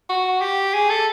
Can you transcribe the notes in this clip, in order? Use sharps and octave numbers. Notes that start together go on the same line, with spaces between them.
F#4
G4
G#4
A4